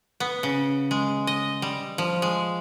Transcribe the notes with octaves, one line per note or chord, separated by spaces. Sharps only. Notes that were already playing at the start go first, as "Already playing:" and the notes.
B3
C#3
G#3
D#5
G3
F3
G#3